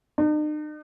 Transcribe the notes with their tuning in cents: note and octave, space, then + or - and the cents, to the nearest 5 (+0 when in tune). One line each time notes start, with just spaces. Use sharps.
D#4 -45